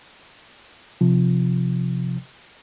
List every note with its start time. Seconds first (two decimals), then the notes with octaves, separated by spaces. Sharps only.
1.01 C3 F3